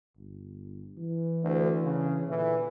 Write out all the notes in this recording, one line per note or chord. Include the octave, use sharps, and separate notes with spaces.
G1
E3
D2
C#3
A#2 D3 E3